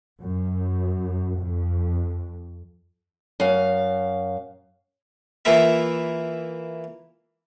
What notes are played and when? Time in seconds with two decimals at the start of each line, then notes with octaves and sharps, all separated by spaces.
0.23 F#2
1.39 F2
3.40 F#2 F5
5.45 E3 A#3 E4 F4 E5